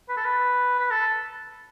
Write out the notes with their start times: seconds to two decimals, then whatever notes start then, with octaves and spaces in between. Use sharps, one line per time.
0.09 B4
0.17 A4
0.25 B4
0.79 B4
0.91 A4